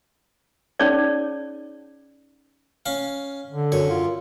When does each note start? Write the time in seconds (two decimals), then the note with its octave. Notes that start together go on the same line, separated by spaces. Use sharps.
0.80 C#4 D#4 G#4 C#5 D5
2.86 C#4 F5
3.51 D3
3.72 F#2 C#5
3.90 F4